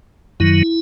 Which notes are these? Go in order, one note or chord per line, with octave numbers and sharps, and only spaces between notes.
F#2 D#3 F#3 E4